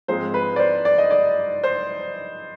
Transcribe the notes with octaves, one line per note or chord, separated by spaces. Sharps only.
G#2 F3 G#3 C4 C5
B4
D5
C5
D5
D#5
D5
C5